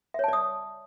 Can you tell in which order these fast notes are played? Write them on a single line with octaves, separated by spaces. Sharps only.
E5 C#5 A5 D5 D#6